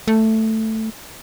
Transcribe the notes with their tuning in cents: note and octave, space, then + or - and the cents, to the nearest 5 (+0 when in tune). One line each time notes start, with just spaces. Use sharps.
A3 +5